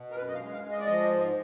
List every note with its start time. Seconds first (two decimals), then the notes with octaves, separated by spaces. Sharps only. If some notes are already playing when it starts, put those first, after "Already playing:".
Already playing: B2
0.11 A#4
0.16 F#2 B4
0.28 D#5
0.35 F5
0.41 G#3
0.53 F5
0.65 G#3
0.71 D#5
0.79 D5
0.86 F3 D#5
1.13 G#2